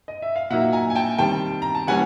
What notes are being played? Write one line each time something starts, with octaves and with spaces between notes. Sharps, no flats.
D#5
E5
F5
A#2 F#3 A#3 D#4 E5 F#5
G#5 A#5
G#5
G5 A5
D#3 G3 C4 G5 A5
A#5
A5
E3 G3 A#3 C#4 F#5 G#5